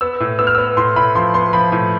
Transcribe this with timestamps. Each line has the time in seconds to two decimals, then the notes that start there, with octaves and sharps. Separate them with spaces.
0.01 B3 E6
0.20 A2
0.39 B3 E6
0.47 F6
0.55 B3 E6
0.77 A2 C6
0.96 A2 B5
1.15 F3 C6
1.34 B3 C6
1.53 F3 B5
1.72 A2